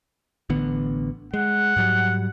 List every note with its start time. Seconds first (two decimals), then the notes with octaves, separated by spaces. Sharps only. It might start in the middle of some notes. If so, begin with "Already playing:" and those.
0.50 A1 D3 B3
1.34 G#3 F#5
1.76 G#2 F#3 G3